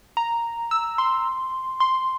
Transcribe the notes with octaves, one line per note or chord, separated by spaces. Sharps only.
A#5
E6
C6
C6